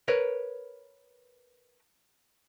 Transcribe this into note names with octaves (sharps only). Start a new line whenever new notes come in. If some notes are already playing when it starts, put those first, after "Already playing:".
A#4 B4 C#5